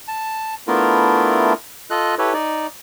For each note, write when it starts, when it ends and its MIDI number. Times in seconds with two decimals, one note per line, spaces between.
0.08 0.54 81
0.68 1.53 57
0.68 1.53 59
0.68 1.53 62
0.68 1.53 64
0.68 1.53 65
0.68 1.53 70
1.90 2.15 65
1.90 2.15 69
1.90 2.15 75
1.90 2.15 90
2.18 2.33 64
2.18 2.33 67
2.18 2.33 69
2.18 2.33 71
2.18 2.33 73
2.33 2.67 63
2.33 2.67 74